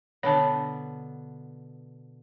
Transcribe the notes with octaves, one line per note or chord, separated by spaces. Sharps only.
B2 D3 B3 C#5 A5